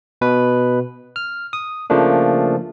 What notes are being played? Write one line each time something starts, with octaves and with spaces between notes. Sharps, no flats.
B2 B4
F6
D#6
C#3 F3 A3 A#3 D4